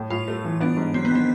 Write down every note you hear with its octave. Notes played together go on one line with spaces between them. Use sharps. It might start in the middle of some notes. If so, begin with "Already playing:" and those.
Already playing: A2
A2 F4
A3
E3
B3 D4
G#2
F#3 C4
B3
D#3 C4